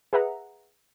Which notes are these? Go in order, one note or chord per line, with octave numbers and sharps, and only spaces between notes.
G#4 B4 E5 F#5 A#5